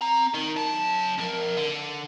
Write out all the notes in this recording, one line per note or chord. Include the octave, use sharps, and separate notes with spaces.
C4 A#5
D#3
F#2 A5
F2 A#4
D3